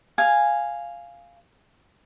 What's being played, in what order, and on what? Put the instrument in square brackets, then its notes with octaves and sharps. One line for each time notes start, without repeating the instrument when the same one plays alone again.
[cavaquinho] F5 G#5